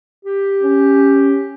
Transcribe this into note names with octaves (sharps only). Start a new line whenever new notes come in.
G4
C#4